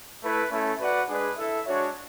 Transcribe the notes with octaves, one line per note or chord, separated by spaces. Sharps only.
A3 E4 B4
A3 C#4 E4
F#4 B4 D5 F#5
G#3 D4 G#4 B4
E4 A4 E5
G#3 D4 F#4 C#5